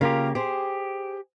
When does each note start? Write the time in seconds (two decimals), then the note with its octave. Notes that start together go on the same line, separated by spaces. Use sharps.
0.01 C#3 A#3 F4 G4 A#4 F5
0.35 G4 G#4 C5 G#5